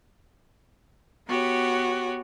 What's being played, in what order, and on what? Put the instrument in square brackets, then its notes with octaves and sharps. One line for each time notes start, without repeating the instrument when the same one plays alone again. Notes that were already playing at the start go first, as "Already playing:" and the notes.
[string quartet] B3 F#4 G4 C#5